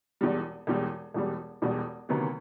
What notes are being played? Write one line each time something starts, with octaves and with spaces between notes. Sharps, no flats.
E1 E2 B2 G3
E1 E2 B2 G3
E1 E2 B2 G3
E1 E2 B2 G3
D2 C3 D#3 F#3 B3